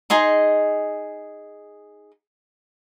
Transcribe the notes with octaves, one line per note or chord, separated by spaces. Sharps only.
D#4 G#4 D#5 C6